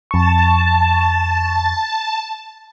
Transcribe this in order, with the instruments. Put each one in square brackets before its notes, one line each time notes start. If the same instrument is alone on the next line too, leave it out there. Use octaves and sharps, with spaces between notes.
[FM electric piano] F2 C#6 [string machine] A5